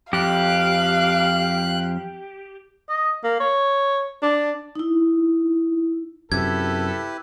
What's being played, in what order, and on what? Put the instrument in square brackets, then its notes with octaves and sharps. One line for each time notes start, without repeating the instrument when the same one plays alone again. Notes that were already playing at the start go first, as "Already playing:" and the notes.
[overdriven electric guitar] F2 [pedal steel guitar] G4 [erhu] F5 [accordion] F#6
[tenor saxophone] D#5
A#3
C#5
D4
[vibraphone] D#4 E4
[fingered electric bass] F#2 C3 [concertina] E4 G4 B4 [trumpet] A4 [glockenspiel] G#6